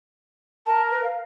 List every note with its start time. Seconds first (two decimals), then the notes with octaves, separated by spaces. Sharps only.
0.66 A#4 A5
0.91 B4
1.04 F5